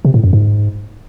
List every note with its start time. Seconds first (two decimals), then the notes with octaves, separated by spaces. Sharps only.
0.05 C3
0.14 A2
0.24 F#2
0.33 G#2